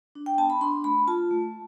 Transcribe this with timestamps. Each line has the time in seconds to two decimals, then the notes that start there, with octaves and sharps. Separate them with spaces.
0.15 D4
0.26 G5
0.38 B3 A5
0.50 B5
0.61 D4 C6
0.84 A3 B5
1.07 F4 A5
1.31 A3